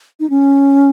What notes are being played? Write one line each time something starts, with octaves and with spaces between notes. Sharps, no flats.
D#4
C#4